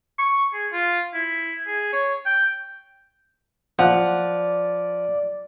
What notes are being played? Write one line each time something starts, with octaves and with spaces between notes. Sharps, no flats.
C#6
G#4
F4
E4
G#4
C#5
G5
F3 D5 F#5